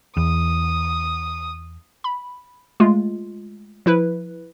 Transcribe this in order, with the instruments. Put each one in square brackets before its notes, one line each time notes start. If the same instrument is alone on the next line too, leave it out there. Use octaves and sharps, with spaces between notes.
[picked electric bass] E2 [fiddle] D#6
[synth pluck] B5
G#3 A3 F4
F3 E4 B4